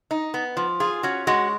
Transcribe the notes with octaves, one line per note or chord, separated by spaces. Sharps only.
D#4
B3
F3
F4 G#4
C#4 F#4
G#3 F#4